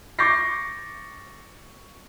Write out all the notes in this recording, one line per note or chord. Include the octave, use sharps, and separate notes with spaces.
C#6 D6 G6 A6 A#6 C7